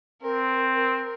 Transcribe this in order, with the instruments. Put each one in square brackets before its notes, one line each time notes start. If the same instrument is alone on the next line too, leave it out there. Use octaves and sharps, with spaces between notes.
[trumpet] C4 [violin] A#4
[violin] A#4